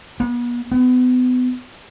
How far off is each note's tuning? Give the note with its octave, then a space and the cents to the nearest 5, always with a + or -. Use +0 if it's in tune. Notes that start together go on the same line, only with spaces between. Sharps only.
B3 -40
B3 +30